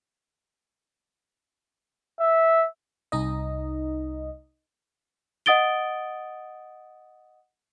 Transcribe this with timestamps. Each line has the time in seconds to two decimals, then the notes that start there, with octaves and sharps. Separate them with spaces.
2.20 E5
3.12 C2 D#4 D#5
5.46 D#5 F#5 D#6 A6 D7 G7